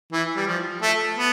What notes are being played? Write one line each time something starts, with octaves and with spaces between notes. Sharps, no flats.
E3
G3
F3
A3
B3